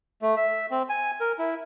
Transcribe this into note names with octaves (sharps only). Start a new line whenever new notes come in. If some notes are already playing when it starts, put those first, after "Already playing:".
A3
E5
C4
G#5
A#4
E4